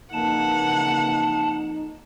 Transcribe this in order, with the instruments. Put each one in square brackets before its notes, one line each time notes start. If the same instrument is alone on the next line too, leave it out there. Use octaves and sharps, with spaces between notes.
[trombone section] F2 D#4 [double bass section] C#3 E3 A#3 [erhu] F#5 [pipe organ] A5